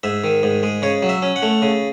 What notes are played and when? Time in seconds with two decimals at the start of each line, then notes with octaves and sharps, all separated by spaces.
0.03 G#2 E5
0.24 D#3
0.43 G#2
0.63 G#3
0.82 C#3 C#5
1.03 F#3
1.09 E5
1.22 C#4
1.36 F#5
1.42 A3
1.62 C#3